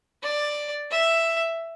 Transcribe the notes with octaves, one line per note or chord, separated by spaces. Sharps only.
D5
E5